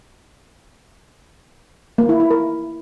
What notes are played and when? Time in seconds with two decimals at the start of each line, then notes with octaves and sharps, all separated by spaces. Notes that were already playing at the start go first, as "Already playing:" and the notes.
1.98 A#3
2.09 E4
2.20 E4
2.31 A#4